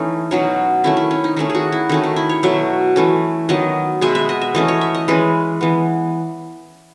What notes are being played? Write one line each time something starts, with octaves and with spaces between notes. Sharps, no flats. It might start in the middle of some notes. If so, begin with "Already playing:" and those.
Already playing: E3 A3 C#4 D#4
B2 F#3 C#4 D#4
D#3 A3 C#4 E4
E4
C#4
D#4
D#3 A3 C#4 D#4
G#4
F#4
E4
D#3 A3 C#4 D#4
D#4
E4
C#5
B2 F#3 A3 E5
E3 A3 C#4
D#3 F#3 B3 D#5
B2 G#3 B3 E5
E5
D#5
E5
E3 A3 C#4 D#5
C#5
E5
D#5
E3 G#3 C#4 B4
E3 B3